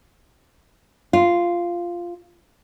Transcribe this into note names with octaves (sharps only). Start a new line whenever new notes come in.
F4